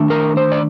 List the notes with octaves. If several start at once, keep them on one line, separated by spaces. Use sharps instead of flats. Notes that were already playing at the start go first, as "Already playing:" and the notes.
Already playing: D#3 A3 D4
A#4
C5
D5